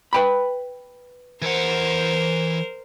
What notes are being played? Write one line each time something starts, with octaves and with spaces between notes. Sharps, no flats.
B4 G5 B5
E3 A#4 C5 F#5